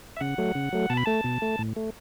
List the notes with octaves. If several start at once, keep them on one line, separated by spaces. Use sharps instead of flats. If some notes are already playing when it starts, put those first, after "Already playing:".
E5
C#3 F#5
F#3 A3
C#3
F#3 A3
B2 A5
B5
A3 A5
B2
A3
A2
A3